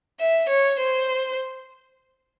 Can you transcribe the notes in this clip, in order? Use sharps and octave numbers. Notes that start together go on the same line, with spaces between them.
E5
C#5
C5